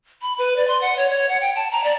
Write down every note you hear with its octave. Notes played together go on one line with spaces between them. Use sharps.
B5
B4
D5
C6
F#5
C#5
C#5
F#5
G5
A5
A#5
D5